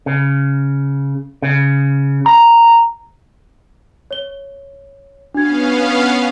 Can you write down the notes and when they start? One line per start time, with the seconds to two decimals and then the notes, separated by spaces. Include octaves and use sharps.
0.06 C#3
1.42 C#3
2.26 A#5
4.11 C#5 G7
5.34 B3 C#4 D4 F#4 F5 G#6